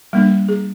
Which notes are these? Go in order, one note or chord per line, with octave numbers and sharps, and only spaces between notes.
G3 A#3 D4
G#4